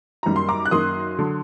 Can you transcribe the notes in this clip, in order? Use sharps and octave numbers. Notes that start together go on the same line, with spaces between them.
F#2 D#3 G3 A#3 A#5
C6
A#5 D6
F#6
F#2 D#3 F#3 A#3 C6 D#6
D3 F#3